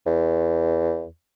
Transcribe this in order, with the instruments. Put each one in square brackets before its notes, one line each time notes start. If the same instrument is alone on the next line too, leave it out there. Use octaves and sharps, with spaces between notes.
[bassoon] E2